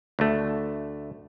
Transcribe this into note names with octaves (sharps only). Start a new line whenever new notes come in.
D2 A3